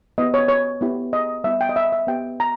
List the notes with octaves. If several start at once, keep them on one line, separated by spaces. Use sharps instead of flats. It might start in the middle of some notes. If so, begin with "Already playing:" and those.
B3 E4 G4 D#5
C#5
C#5
B3 E4 G4
D#5
G3 B3 E4 E5
G5
D#5
E5
E5
B3 G4 G5
A#5